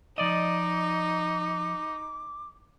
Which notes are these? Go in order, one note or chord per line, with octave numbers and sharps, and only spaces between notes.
F3 D#4 D5 D#5 D6